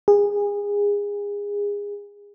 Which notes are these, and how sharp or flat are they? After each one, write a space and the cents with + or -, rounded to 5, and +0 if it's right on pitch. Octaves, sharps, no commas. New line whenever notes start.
G#4 -25